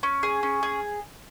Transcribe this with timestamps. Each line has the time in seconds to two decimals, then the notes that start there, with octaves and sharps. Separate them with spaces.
0.03 C#4
0.23 G#4
0.43 C#4
0.63 G#4